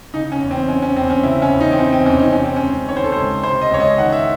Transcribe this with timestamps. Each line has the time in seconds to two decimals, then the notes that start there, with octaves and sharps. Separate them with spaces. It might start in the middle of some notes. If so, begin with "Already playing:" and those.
0.14 C#3 D#4
0.32 C#4
0.41 E2
0.51 C4
0.68 E3 C#4
0.82 C#4
0.96 E2 C4
1.10 C#4
1.23 C#3 E4
1.42 C#4
1.51 E2
1.60 D#4
1.72 C4
1.78 E3 C#4
1.92 C4
2.06 E2 C#4
2.19 D#4
2.32 C3 C#4
2.44 C4
2.56 C#4
2.61 C#2
2.89 D#3 C#5
2.96 C5
3.04 A4
3.12 C#2 C5
3.43 C3 C5
3.61 D#5
3.71 C#2 C#5
3.80 D#5
3.98 D#3 F#5
4.12 E5